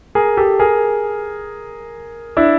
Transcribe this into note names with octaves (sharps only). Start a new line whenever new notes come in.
G#4 A#4
G4 A4
G#4 A#4
D4 E4